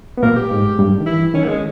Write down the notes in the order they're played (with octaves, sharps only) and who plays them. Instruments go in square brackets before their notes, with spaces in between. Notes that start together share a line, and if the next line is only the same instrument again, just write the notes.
[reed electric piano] B3
[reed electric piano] A#2 A#3 [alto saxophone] A#4
[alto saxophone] G4
[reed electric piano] G#2 G#3
G2 G3
D#3
[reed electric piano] E3 [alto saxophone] E4
[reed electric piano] D#3 [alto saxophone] C#4
[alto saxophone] A#3
G#3